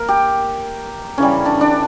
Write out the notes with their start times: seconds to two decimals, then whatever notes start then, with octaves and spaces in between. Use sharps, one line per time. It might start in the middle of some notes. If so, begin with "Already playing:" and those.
Already playing: A#3 A#4
0.08 G4
1.18 C#3 E3 G3 C#4
1.45 D4
1.61 D4